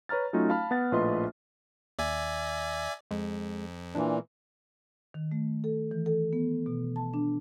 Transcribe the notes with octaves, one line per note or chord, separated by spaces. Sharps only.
B4 C#5 A#5 F6 A6
F#3 A3 C#4 D#4 F4
F5 A5 B5 F6
B3 F#5 A6
A#1 A2 F4 B4 D#5 C6
D#2 D5 E5 G#5
F2 G#3
A#2 E3 D4
D#3
A3
A4
E3
A4
B3
B2
A5
D4